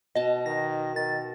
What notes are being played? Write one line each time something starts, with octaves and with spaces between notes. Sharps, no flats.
B2 D#5 A5
D#3 A#6
D#3 A6